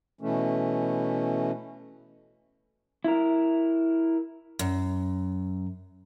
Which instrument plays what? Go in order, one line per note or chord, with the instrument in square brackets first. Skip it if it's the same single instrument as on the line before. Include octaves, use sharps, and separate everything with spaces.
[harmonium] B2 E3 A3 C#4
[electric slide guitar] E4 A#4
[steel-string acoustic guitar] F#2